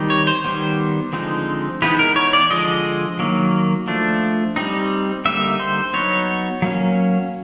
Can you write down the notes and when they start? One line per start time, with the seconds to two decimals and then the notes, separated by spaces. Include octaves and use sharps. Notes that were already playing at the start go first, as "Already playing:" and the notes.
Already playing: D#3 G3 C4 D#4
0.10 C#5
0.27 C5
0.44 D#3 G3 B3
1.13 D3 F3 G#3 C4 D#4
1.82 E3 G#3 B3 D#4 B4
1.99 A#4
2.16 C#5
2.33 D5
2.50 D3 F3 G#3 D#5
3.19 D#3 F#3 A#3
3.87 F3 A3 D4
4.56 G3 C4 D#4
5.25 D3 G3 A#3 D#4 E5
5.60 C5
5.93 F#3 B3 D#4 C#5
6.62 F#3 A#3 C#4